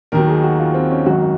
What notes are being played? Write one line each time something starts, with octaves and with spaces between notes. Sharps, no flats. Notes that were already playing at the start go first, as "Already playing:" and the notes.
D#2 D#3 F#3 A#4
G#4
F#4
F4
C4
C#4
G#1 F#2 D#3 F#3 F#4